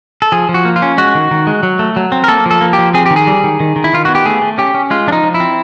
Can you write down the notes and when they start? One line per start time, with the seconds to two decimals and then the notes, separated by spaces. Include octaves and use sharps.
0.22 A4
0.32 F3 G#4
0.49 F3
0.54 F#4
0.65 A#3
0.76 F4
0.82 C#4
0.98 G#3 F#4
1.15 D#3
1.31 D#3
1.47 G#3
1.63 F#3
1.79 A3
1.96 F#3
2.12 C4
2.24 A#4
2.28 A#3 A4
2.46 F3 A4
2.61 A#3
2.73 G4
2.78 F3
2.94 C4 G#4
3.06 D#3 G4
3.16 G#4
3.27 G3
3.44 D#3
3.60 D#3
3.76 D#3
3.84 E4
3.93 D#3 F4
4.05 B3 F#4
4.15 G4
4.25 A3 G#4
4.42 A3
4.58 C#4 G4
4.74 C#4
4.90 G#3 F4
5.07 F3 D4
5.12 D#4
5.23 F3
5.34 E4
5.40 C4